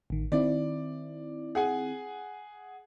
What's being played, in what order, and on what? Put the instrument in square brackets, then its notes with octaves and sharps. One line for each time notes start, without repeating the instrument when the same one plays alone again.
[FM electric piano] A1 D#3
[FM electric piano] D#3 C4 E4 [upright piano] D5
[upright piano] G#4 F#5 G#5